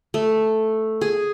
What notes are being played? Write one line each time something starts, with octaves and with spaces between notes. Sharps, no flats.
A3
G#4